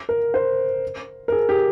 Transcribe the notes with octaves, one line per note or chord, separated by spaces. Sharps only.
A#4
C5
A#4
G#4
G4